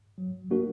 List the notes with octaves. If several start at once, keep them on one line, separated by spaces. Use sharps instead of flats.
F#3
A#3 D4 F#4 A#4